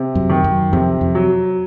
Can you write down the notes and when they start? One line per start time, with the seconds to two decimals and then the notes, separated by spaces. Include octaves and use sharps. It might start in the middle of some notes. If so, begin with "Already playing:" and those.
Already playing: C3
0.15 F#2
0.30 D#3
0.44 F#2
0.73 F2 C3
1.01 F2
1.15 F#3